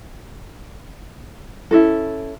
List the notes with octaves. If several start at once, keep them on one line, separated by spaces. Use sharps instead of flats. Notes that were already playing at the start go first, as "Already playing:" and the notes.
C#4 E4 F#4 A4